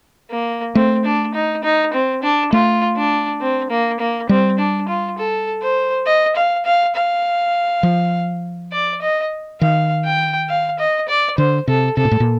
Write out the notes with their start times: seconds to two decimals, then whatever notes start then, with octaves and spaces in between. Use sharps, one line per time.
0.31 A#3
0.75 A3 C4
1.04 D4
1.34 D#4
1.64 D#4
1.93 C4
2.23 D4
2.53 A3 F4
2.97 D4
3.41 C4
3.70 A#3
4.00 A#3
4.29 G3 C4
4.59 D4
4.88 F4
5.18 A4
5.62 C5
6.06 D#5
6.36 F5
6.65 F5
6.96 F5
7.83 F3
8.73 D5
9.02 D#5
9.61 D#3 F5
10.05 G5
10.49 F5
10.79 D#5
11.08 D5
11.37 D3 C5
11.68 C3 A4
11.97 C3 A4
12.05 A#2
12.11 A2
12.20 A#2